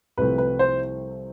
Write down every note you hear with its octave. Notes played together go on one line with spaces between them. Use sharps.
C2 C3 F3 A3 C4 B4
B4
C5